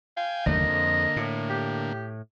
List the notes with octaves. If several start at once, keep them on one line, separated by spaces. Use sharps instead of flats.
F5 G5 G#5
F#1 D#2 D3 A3 A#3 D#5
F2
A2
G4